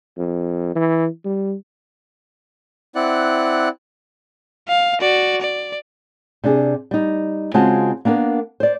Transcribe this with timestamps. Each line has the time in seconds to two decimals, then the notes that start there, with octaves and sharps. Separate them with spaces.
0.17 F2
0.76 E3
1.25 G3
2.95 C4 E4 D5 F#5 F#6
4.68 F5
5.01 F#4 D5
5.41 D5
6.44 C3 D4 G#4
6.91 G3 D#4
7.54 C#3 G#3 C4 F4 F#4 A5
8.05 A#3 B3 D4 A#4
8.60 C5 D5